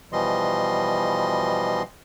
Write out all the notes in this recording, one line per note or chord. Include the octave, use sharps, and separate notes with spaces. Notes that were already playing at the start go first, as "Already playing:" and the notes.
B2 E3 F3 G3 D#5 C6